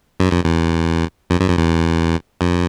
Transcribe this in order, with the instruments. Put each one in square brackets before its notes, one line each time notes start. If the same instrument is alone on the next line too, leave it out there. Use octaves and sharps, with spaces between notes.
[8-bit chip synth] F#2
F2
E2
F2
F#2
F2
E2
F2